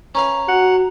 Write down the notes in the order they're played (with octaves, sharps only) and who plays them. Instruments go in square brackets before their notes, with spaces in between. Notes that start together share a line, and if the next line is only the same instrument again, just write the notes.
[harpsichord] C#4 B4 F5 [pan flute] A#5
[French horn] F#4 [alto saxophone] F#5